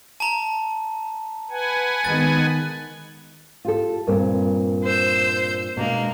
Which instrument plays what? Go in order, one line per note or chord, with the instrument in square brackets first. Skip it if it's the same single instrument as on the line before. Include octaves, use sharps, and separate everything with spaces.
[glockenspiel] A5 A#5
[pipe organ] B4 F#5 G#5
[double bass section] D#3 G#3 B3 [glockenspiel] A6
[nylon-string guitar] F4 G4 A4
[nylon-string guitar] G2 A#2 C4 [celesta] A#4
[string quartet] C5 E6 G6
[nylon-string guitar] B2 B3 D4 [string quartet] G#3 A#3